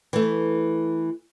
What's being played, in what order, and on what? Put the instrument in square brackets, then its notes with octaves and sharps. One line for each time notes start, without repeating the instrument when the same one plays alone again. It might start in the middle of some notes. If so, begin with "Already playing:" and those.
[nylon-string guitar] E3 A3